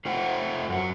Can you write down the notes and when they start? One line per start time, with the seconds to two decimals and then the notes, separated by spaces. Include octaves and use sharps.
0.05 A3 F4 C5 F#5 G5
0.69 F#2 F#4